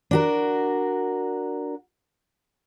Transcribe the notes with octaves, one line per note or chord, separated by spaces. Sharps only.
D4 F#4 A#4